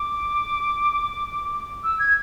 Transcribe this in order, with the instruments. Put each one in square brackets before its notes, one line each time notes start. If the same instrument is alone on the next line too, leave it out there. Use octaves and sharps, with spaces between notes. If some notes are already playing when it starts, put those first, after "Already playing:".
Already playing: [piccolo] D6
E6
G#6